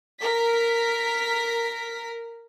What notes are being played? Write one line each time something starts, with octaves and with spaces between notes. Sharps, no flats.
A#4 B6